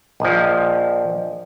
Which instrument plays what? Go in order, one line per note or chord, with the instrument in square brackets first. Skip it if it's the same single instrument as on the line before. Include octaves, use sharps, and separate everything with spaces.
[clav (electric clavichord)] A#1 F3 [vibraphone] D5 D#5